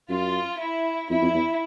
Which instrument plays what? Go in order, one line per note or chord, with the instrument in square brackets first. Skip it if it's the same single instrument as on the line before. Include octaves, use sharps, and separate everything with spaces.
[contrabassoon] F#2 [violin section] F4
[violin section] E4
[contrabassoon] F2 [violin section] E4
[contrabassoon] F2
E2